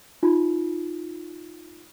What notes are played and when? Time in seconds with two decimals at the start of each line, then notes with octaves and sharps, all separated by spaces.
0.23 D#4 F4